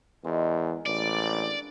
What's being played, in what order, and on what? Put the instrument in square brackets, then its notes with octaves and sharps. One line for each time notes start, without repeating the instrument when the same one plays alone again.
[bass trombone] E2 [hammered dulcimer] D#3 G#3 C6
[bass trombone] A1 [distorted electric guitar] D5
[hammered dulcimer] D4